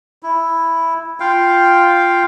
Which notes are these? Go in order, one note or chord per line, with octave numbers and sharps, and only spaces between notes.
E4
F4 F5 G5